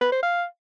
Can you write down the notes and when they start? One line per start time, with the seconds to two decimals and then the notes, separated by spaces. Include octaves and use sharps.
0.01 B4
0.12 C5
0.23 F5